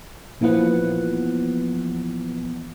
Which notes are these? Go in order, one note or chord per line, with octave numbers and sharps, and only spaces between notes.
A#1 A#2 E3 F3 B3 F#5